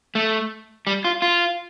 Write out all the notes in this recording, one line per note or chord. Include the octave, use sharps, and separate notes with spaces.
A3
G3
F4
F4